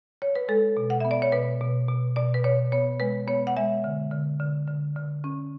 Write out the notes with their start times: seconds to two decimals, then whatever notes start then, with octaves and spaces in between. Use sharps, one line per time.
0.22 C#5
0.35 B4
0.48 G#3 A4
0.77 B2
0.90 F#5
1.00 B3 E5
1.11 D5
1.22 C#5
1.32 B2 B4
1.61 B2
1.88 B2
2.16 B2 D5
2.34 B4
2.44 B2 C#5
2.72 B3 C#5
3.00 G#3 B4
3.28 B3 C#5
3.47 F#5
3.56 G#3 E5
3.84 D3
4.11 D3
4.40 D3
4.67 D3
4.96 D3
5.24 C#4